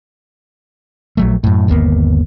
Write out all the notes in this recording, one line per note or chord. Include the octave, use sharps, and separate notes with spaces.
A#1 F#3 A3
F#2 A2
G1 D#2 A#3 B3